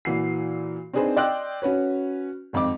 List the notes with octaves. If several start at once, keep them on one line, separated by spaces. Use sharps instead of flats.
A#2 E3 F#4 C7
C4 D4 D#4 G#4 B4 C5
D5 D#5 G5 C6 E6 F#6
C#4 F#4 B4 C#5
G#1 F2 C4 D6